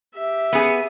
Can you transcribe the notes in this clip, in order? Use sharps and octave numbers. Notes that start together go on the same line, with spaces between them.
G4 E5
B3 G#4